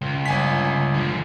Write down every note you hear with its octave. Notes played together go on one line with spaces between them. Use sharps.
C#2
G1 G#5 B6
D3 F3